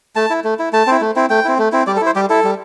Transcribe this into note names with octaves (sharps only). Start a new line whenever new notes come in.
A3 A5
E4
A3
E4
A3 A5
C4 E4
A3
C4 E4
A3 G5
C4 E4
A3
C4 E4
G3 D5
A4
E4 C5
G3 G4
E4 A4
G3